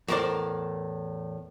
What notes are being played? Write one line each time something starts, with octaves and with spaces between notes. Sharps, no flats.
E2 A2 A#4 C5 D5